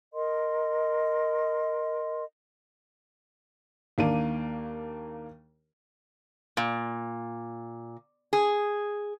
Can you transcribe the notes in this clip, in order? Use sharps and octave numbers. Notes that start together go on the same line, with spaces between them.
A#4 D#5 C6
D#2 A#3 D4 D#7
A#2
G#4